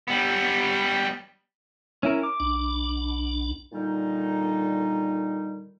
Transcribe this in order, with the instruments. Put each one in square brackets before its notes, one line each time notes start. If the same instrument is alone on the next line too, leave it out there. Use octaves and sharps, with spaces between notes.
[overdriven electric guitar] G3 B3
[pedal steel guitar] C#4 E4 A#4
D6
[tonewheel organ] B1 D4
[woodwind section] A#2 D3 D#3 G3 D#4